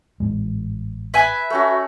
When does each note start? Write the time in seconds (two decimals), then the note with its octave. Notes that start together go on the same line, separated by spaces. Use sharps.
0.20 A1 G#2 G#3
1.14 B4 E5 G#5
1.50 A3 C#4 F#4